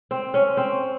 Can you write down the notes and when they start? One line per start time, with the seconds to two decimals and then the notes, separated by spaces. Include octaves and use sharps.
0.11 C4
0.34 C#4
0.57 C4